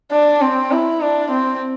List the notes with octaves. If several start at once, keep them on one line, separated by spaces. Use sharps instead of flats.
D4
C4
E4
D4
C4